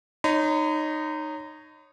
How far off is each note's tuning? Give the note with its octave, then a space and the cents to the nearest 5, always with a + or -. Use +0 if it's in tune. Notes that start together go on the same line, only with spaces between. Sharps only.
D#4 -15 C#5 +0 B5 +45